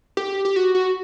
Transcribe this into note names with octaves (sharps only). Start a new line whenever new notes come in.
G4
G4
F#4
F#4